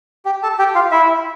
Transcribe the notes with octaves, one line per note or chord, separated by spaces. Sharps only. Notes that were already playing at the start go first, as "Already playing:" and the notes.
G4 G5
A4 A5
G4 G5
F4 F5
E4 E5